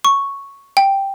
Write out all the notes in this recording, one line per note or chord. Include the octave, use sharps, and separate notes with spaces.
C#6
G5